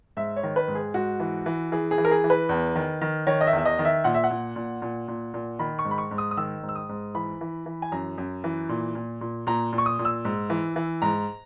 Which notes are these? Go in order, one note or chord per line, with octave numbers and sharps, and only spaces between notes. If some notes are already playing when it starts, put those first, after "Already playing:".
G#2 E5
C#5
D#3
B4
G#2
G#4
G#2 F#4
E3
E3
E3 G#4
G#4
E3
A#4
G#4
E3
B4
E2
D#3
D#3
D#3 C#5
D#5
E5
E2
E5
D#5
D#3
E5
A#2 F#5
E5
F#5
A#2
A#2
A#2
A#2
A#2
D#3 B5
C#6
G#2
B5
C#6
G#2
D#6
D#6
D#3 E6
G#2
E6
D#6
G#2
E3 B5
E3
E3
G#5
F#2 A#5
F#2
E3
A#2
A#2
A#2
A#2 A#5
A#2
C#6
D#6
A#2
E6
G#2
E3
E3
G#2 A#5